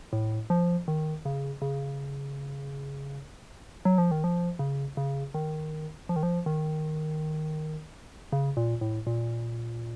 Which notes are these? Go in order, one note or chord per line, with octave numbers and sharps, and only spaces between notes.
A2
F3
D#3
C#3
C#3
F#3
F3
D#3
F3
C#3
C#3
D#3
F3
D#3
F3
D#3
C#3
A#2
A2
A#2